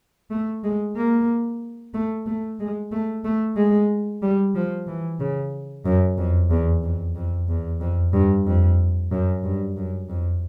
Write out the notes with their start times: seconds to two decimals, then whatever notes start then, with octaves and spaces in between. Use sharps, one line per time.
0.30 A3
0.63 G#3
0.96 A#3
1.94 A3
2.26 A3
2.59 G#3
2.92 A3
3.24 A3
3.56 G#3
4.22 G3
4.55 F3
4.87 E3
5.20 C#3
5.85 F#2
6.18 F2
6.50 E2
6.83 F2
7.16 F2
7.48 E2
7.81 F2
8.13 G2
8.46 F2
9.11 F#2
9.44 G2
9.76 F#2
10.09 F2